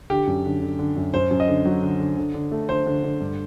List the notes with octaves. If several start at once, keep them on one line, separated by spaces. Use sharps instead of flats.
D3 G4
F#2
D3
D3
D3
F#2
F#2 C5
F#2
D#5
D3
F#3
D3
D3
D3
D3
A3
D3 C5
D3
D3
G2